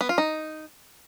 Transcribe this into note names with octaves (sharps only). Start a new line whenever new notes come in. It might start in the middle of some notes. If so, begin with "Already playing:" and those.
B3
F4
D#4